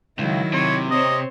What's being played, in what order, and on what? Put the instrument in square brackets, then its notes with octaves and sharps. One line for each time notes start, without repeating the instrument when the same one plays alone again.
[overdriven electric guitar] C#2 [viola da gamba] D#3 F#3 E4
[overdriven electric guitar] C3 [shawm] C#5
[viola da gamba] C4 C5 C#5 [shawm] D#5